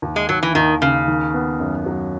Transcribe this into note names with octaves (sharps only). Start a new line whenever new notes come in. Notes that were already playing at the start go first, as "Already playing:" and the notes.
D#2
G#3
D#2 F#3
E3
D#2 D#3
D#2 C#3
D#3
B3
F#2
F#3